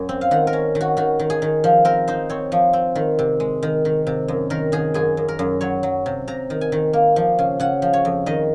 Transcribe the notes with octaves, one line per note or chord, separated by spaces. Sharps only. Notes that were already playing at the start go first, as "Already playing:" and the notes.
Already playing: F#2
C4
F5
D#3 F#5
A#4
C#4
D#3
F#4
D#3 F#4
D#3
G#4
D#3
F3
C4 A#4
D#4 C5
C4 C#5
F3
C4
D#3
C3
G#3
D#3
D#3
C3
F#2
D#3 A#4
D#3 G#4
F#2 G#4
F#2
A#4
F#2
F#3 C#5
F#3
C3
C3 A#5
D#3
G#5
D#3
A#3
F3
C#3
C#3 F#5
F3
C#5
F2
D#3 D#5